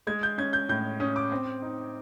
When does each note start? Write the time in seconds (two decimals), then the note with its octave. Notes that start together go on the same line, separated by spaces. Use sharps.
0.07 G#3 G#6
0.23 G6
0.38 C#4 G#6
0.53 G6
0.69 A2 G6
1.00 C#4 D#6
1.16 D6
1.32 C4
1.62 D#4